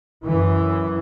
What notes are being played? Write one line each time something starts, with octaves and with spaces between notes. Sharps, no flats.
F#2 E3